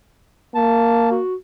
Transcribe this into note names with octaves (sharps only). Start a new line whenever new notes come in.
A#3 A5
F#4